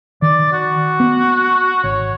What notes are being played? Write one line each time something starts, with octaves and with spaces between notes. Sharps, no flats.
D#3 D5
F#4
B3
G#1 C#5